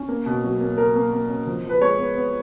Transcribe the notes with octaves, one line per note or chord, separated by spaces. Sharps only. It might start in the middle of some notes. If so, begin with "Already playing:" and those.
Already playing: C#4
A#3
B2
F#3
A#3
F#3 A#4
A#3
A#3
C#4
F3
F3
B4
G#3 C#5
B3
B3